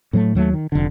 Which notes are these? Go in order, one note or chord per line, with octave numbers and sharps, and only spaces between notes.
A2 F#3 G#3 A3
D#2 F#3 G#3 A3
D#3
F1 D3